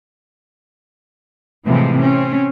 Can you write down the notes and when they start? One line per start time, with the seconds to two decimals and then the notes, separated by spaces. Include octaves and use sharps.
1.67 A2 C3 E3 F3 G#3
2.00 C4 C#4